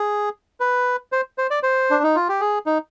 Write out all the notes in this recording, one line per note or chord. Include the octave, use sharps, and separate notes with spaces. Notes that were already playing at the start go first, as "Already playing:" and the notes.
Already playing: G#4
B4
C5
C5
D5
C5
D4
D#4
F4
G4
G#4
D#4